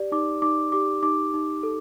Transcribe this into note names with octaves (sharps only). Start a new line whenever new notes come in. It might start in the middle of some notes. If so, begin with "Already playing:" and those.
Already playing: G4 D5
D#4 D6
D#4 D6
G4 D6
D#4 D6
D#4
A4